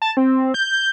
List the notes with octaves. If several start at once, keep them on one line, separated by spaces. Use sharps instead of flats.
A5
C4
G6